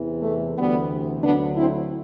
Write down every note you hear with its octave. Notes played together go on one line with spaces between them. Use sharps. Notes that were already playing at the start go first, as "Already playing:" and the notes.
Already playing: E2 C3 E3
A3
D2 C3 E3 G3 B3
D2 D3 F#3 B3 D4
C4 E4